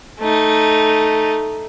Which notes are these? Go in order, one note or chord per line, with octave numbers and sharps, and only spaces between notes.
A3 D#4